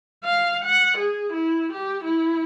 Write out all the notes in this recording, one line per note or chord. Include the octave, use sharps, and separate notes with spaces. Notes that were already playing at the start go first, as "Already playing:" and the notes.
F5
F#5
G#4
E4
G4
E4